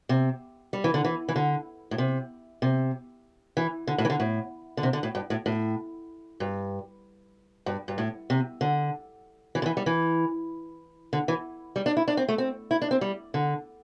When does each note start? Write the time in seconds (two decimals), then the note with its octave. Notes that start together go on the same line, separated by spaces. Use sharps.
0.09 C3
0.73 G3
0.84 E3
0.94 D3
1.04 E3
1.29 E3
1.36 D3
1.91 A2
1.98 C3
2.62 C3
3.57 E3
3.87 D3
3.98 A2
4.05 E3
4.10 D3
4.20 A2
4.77 D3
4.83 C3
4.93 D3
5.03 A2
5.15 G2
5.30 A2
5.46 A2
6.40 G2
7.66 G2
7.88 G2
7.98 A2
8.30 C3
8.61 D3
9.55 E3
9.62 D3
9.66 E3
9.77 G3
9.86 E3
11.13 D3
11.28 E3
11.76 G3
11.86 D4
11.97 E4
12.08 D4
12.17 C4
12.28 A3
12.38 C4
12.71 E4
12.82 D4
12.91 C4
13.01 G3
13.34 D3